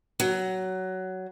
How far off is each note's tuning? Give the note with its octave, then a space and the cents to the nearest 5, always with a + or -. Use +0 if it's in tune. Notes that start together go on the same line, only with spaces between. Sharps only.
F#3 +15